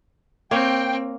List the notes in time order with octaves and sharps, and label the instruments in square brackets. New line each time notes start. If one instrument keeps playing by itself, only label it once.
[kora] A#3 C#5 [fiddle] C4 [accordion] G5